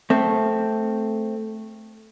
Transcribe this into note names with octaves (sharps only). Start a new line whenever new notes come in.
A3 C4